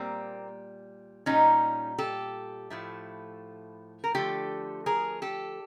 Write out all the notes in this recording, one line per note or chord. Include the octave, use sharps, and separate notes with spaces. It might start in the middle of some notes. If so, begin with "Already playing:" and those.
Already playing: A#2 G3 A#3 C4
A#2 G3 C#4 D#4
G4 A4
A2 F3 A3
A#4
D3 F3 A3 G4 A4
G#4 A#4
G4 A4